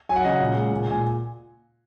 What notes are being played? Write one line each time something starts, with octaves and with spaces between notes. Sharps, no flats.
F#3 G#5
F#5
C#3 D#5
F#5
A#2
G#3
A#2
A#2 G#5